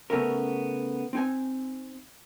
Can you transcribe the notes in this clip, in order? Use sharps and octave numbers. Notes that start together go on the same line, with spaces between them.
C#3 A3 B3 C#4 A#4
C4 D#4 G#5